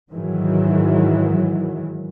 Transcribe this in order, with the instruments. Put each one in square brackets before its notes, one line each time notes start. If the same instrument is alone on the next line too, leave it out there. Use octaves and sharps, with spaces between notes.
[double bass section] G#2 D#3 E3 F#3